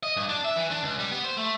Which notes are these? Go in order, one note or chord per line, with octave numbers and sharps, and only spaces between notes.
D#5
G2
D4
E5
E3
D4
C#2
G3
B3
C5
A3